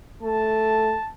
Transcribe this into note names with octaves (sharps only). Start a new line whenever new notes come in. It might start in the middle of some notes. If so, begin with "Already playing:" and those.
A3 A5